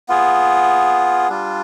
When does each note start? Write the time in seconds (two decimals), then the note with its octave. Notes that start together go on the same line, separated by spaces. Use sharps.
0.09 B3 F4 G#4
1.29 G3 D4 F4